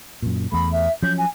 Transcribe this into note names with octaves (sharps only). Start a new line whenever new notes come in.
F#2 A#2
E2 A3 B5
E5
F3 F#3 C#4 G6
G#5